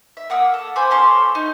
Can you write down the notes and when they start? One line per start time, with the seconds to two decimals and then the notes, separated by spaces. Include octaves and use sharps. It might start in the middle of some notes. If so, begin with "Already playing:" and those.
0.17 E5
0.30 A#3 F#5 D#6 E6
0.54 A4
0.76 C5 G#5 B5 D6
0.91 C#4 A4 C6 C#6
1.35 D#4